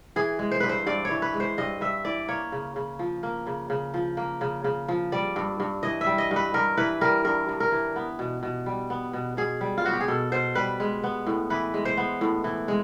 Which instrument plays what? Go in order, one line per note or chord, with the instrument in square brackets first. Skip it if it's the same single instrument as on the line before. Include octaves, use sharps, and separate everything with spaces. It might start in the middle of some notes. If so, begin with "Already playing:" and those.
[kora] E3 G#4
G#3
C5
G2 B4
C5
G2 D5
C#5
E3
B4
G#3
C5
G2 D#5
G2 E5
E3 D5
A#3 C#5
C#3
C#3
F3
A#3
C#3
C#3
F3
A#3
C#3
C#3
F3
G3 D5
G2
G2
E3 D#5
E5
G3
D#5
G2
B4
G2 A#4
E3 B4
G3 A#4
G2 A#4
G2
A#4
E3
B3
B2
B2
G3
B3
B2
B2 G#4
G3
F4
B3 F#4
G4
G#4
B2 A4
B2 C5
G3 B4
G#3
B3
A2
E3 B4
G#3
C5
B3
A2
E3
G#3